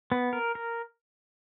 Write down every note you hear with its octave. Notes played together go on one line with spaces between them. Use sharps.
B3
A#4
A#4